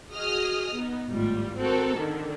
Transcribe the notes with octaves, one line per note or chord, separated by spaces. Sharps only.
F#4 G#4 D#5 D#6 F6
B3 D#4
G#1 A2 G3 F4
C4 F#4 A4 A#4
D3 D#3